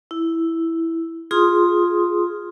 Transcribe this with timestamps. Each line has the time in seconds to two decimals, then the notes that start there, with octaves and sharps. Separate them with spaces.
0.11 E4
1.31 F4 G#4 C6 D#6